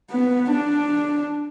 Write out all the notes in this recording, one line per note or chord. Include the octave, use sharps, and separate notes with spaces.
B3
D4